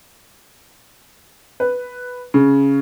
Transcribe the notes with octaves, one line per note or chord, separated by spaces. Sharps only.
B4
C#3